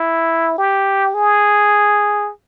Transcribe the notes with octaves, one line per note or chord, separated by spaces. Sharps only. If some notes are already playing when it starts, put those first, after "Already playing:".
Already playing: E4
G4
G#4